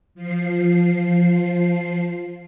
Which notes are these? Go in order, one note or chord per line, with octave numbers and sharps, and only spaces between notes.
F3 C7